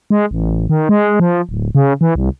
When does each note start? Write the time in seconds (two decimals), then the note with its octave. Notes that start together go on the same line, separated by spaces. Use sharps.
0.10 G#3
0.31 A1
0.69 D#3
0.89 G#3
1.20 F3
1.49 D1
1.75 C#3
2.01 E3
2.15 C2